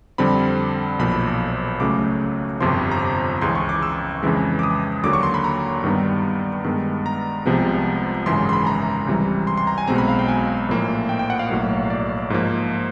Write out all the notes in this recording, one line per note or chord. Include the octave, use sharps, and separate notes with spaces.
F2 D3 G3 C4 B5
B1 A#2 F3 B5
C#2 C#3 F#3 A3 D6
G1 F2 C3 F3 C6
A#5
C#2 C#3 E3 C6
C#6
D6
E6
F2 C#3 E3 G#3
D6
D#6
D#2 D3 F#3 A#3 D6
C#6
C6
B5
A#5
G2 D#3 G3 B3
G2 D#3 G#3 B3
A#5
C2 C3 F3 G#3 B3
G#1 F#2 C#3 E3 G#3 C6
C6
B5
A#5
C#2 C3 E3 G3
C6
C6
A#5
G#5
B1 B2 G#3 C4 A#5
B5
F5
G5
G#5
A#1 A2 F3 A#3
G5
G5
F#5
F5
B1 A2 F#3 A#3
D5
G#2 F3 A#3